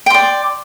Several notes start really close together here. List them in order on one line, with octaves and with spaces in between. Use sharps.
G5 C6 D5